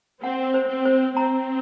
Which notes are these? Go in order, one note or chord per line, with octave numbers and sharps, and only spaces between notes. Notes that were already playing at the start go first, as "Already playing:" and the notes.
C4 F#5
C5
C4
C5
C4 A#5